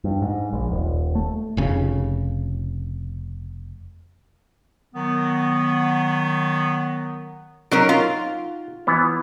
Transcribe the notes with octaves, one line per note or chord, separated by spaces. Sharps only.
G2
G#2
A#1
D#1
A3
F1 C#3
D#3 F#3 B3
F#3 C#4 D#4 A#4
F4
E3 B3